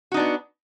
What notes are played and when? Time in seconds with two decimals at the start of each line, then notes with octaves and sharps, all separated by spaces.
0.12 F#4
0.14 D#4
0.17 D4
0.19 B3